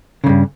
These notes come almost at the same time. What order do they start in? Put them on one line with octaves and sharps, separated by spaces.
C#3 E2 G2